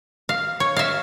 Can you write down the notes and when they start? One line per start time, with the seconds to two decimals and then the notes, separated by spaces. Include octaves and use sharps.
0.29 F5
0.60 C#5
0.76 E5 F5